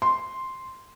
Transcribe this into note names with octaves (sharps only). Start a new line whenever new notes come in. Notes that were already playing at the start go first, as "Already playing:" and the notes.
C6